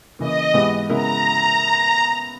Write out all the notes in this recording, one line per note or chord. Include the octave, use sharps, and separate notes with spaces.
C#3 E3 A#3 D#5
G#2 E3 G#3 B3 G4
C#3 G#3 B3 E4 A#4 A#5